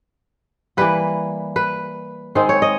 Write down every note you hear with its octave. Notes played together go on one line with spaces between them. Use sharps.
E3 G3 A#3 B4
B4
D#3 G#3 C4 D#4 C5
C#5
D#5